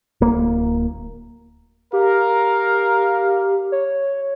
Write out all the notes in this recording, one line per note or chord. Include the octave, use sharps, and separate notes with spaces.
D1 A#3
G4 A#4 F5
C#5